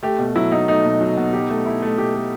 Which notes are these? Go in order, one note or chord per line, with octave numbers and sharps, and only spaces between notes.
A3 G4
B2
F#3 E4
B2 D#4
A3 D#4
B2
F#3
B2
G4
A3
E4
A3
G4
A3